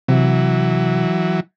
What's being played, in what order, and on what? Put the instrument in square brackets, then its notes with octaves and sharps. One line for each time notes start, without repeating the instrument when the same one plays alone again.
[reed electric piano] C3 [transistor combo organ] E3 F#3